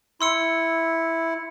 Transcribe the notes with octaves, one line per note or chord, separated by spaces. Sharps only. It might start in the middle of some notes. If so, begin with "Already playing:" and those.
E4 C6 E6 C#7